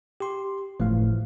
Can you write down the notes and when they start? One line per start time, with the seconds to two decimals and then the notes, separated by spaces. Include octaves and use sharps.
0.20 G4 C6
0.80 G1 A2 E3 F3 A3 F5